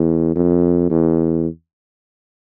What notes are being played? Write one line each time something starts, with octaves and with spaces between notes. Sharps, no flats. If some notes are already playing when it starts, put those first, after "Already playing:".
Already playing: E2
F2
E2